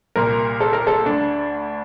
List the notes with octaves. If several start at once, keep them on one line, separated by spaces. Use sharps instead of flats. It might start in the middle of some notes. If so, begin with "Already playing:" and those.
C2 A#2 A#4
A4
A#4
A4
D2 D3 D4